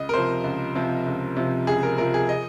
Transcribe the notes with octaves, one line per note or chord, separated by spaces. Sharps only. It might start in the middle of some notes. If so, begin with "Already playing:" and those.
Already playing: C#2 D#5
A#4
C3 F3 C5
C#2
C3 F3
C#2
C3 F3
C#2 G#4
A#4
C3 F3 A#4
G#4
D#5